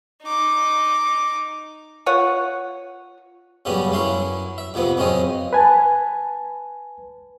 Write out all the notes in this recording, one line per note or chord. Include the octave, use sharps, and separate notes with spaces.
D#4 D6
F4 C#5 F#5
F#2 C#3 G3 B3 C#4
F#2 F#3 C#4 E4 C6
E5
F2 C3 F3 B3
F#2 C#3 C4 C#4 D#5
B4 G#5 A5